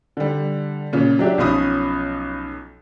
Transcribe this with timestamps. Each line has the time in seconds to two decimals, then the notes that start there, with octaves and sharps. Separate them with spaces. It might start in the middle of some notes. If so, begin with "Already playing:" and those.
0.17 D3 G3
0.93 A#2 C#3
1.19 F#3 D4 G4 E5
1.38 B1 F3 C#4 B5 D#6